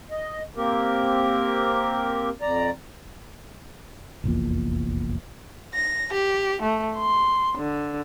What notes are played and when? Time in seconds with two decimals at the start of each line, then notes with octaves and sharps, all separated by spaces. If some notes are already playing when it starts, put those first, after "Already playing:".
0.11 D#5
0.57 A#3 C4 G4 A#4
2.42 F2 D5 A#5
4.24 F1 A#1 E2 A#2
5.75 A#6
6.14 G4
6.62 A3
6.96 C6
7.58 D3